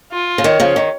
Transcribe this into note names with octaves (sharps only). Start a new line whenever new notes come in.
F4
C#3
D#3 C#5
C#3 F3
D#3